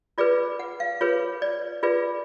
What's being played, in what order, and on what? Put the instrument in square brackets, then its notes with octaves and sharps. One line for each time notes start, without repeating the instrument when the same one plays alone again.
[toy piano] F4 G#4 B4 D5
F#5
F5
F4 G#4 B4 C#5
D5
F4 G#4 B4 D5